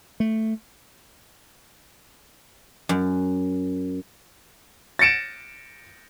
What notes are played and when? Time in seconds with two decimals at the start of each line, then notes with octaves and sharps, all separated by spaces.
0.20 A3
2.89 F#2
4.99 A6 A#6 C#7 D7 E7